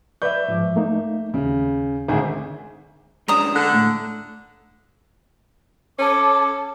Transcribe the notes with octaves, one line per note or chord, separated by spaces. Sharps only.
B4 D5 E5 C#6 G6
G#2 F3 D6
A3 A#3 D#4
D#2 C#3
G#1 D2 G#4 C5
G#3 C#4 D4 A#5 D#6
D3 F#6
A2
C#4 A4 D6